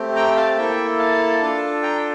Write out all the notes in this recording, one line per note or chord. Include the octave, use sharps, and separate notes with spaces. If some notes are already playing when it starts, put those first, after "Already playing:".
Already playing: A3 C4 G4
G5 A#5
F5 A5
A#3 E4 A4 E5 G5
F5 A5
D4 F4 A4
G5 A#5